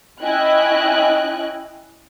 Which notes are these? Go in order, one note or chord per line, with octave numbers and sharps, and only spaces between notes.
C#4 E4 D#5 G5 G#5 F#6